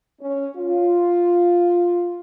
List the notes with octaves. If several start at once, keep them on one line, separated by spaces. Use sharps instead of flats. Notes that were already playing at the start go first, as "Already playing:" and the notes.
C#4
F4